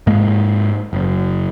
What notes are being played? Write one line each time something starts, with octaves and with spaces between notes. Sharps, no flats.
G#2 G#3 A#3
F#1